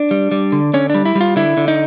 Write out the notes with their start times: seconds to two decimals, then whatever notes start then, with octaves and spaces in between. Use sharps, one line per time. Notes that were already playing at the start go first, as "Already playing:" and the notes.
Already playing: D4
0.11 G3
0.32 G3
0.52 D3
0.74 D3 C#4
0.90 G3 D4
1.05 E4
1.15 G3
1.20 F4
1.36 D3 E4
1.57 D3
1.68 D#4